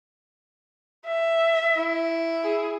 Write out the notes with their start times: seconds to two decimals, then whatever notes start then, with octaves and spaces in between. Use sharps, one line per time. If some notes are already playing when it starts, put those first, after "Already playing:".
1.06 E5
1.77 E4
2.44 G#4